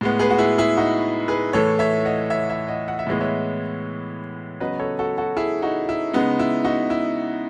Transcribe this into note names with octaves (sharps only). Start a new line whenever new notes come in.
A2 G#3 B3
G#4 B4
F#4
E4 G#4
E4 G#4
D#4 F#4
G#4 B4
A2 E3 A3 A4 C#5
C#5 E5
D#5 F#5
C#5 E5
C#5 E5
D#5 F#5
F#5
E5
A2 E3 G#3 B3 D#5
C#5 E5
C#3 F#3 B3 B4 D#5
A4 C#5
F#4 A4
F#4 A4
E4 G#4
D#4 F#4
E4
C#3 G#3 B3 D#4
E4
D#4 F#4
E4